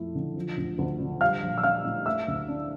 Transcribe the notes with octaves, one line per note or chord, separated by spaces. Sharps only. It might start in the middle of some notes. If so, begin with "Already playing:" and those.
Already playing: F2 A3 E4
D3
F3
D2
D2
D3
G3 F5 F6
A#1
E6
D4 F5 F6
A2
A3 E5 E6
D2
D4